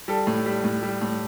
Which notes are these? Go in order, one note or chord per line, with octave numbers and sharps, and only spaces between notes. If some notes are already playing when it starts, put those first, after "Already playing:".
G3 A4
A2
G3
A2
G3
A2